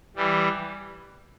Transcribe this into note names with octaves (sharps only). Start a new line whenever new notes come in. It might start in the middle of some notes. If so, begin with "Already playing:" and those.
E3 G3